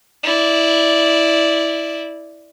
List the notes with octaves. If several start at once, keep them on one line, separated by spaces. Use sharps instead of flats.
E4 D5